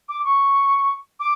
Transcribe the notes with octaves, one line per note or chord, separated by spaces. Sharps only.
D6
C#6
D6